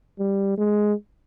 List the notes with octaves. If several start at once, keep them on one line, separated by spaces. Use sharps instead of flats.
G3
G#3